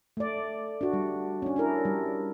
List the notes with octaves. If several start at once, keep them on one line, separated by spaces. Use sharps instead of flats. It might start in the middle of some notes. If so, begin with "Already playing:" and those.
A3 D5
D4 F#4
G3
C#4 D4
D4 E4 A#4
G3